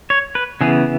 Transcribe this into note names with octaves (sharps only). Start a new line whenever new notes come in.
C#5
B4
C#3 E3 B3 G#4